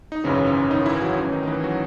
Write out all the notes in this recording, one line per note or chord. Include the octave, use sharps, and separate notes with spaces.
D#4
G#1 F#2 C#3 E3 C#4
C#4
D#3 D#4
E3 E4
F#3 F#4
A1 A2 E3 C#4
D#3 D#4
D#4
E3 E4
F#3 F#4